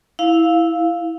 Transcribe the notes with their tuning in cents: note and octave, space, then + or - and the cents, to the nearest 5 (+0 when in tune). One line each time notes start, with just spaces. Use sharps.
E4 -10 F5 +0